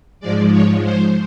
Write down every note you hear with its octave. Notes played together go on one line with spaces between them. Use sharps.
G#2 F3 G#3 D5
C#5
C5